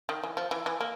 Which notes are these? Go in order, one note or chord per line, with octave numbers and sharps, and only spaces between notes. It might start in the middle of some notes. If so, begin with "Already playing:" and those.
D#3
E3
F3
E3
E3
A#3